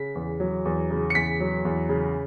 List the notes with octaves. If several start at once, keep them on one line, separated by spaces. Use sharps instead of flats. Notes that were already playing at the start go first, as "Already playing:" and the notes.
Already playing: C#3 B6
E2
F#3
E2
C#3
C#7
E2 B6
F#3
E2
C#3